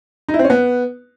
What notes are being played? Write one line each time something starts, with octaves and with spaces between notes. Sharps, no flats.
D#4
E4
C4
C#4
B3